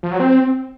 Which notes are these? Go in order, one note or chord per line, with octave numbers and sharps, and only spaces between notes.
F3
F#3
C4